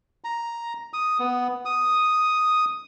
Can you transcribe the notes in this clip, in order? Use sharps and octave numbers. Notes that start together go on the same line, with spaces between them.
A#5
D#6
B3
D#6